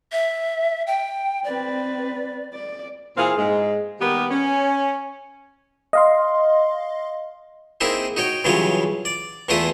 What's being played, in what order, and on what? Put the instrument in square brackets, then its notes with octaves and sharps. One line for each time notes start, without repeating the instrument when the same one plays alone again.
[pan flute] E5
G5
[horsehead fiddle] C4 B4 [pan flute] D5
[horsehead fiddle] D5
[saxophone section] A#2 E3 C4 G#4 F5
G#2 G#3
D#3 G3 A#3 B3 G4 B4
C#4
[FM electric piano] D#5 F5 C6
[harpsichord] A#3 C4 D#4 E4 G#4
D#4 F#4 C#5 G5
G2 C#3 E3 F#3 F4 C#5
D5
E2 E3 A3 E4 F4 D#6